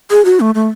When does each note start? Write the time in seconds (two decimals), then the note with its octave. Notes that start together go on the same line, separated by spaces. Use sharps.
0.11 G#4
0.25 F#4
0.40 A3
0.55 A3